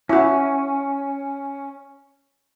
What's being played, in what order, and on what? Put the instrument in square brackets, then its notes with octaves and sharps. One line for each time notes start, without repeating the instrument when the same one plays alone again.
[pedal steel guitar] C#4 [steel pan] E4 F#4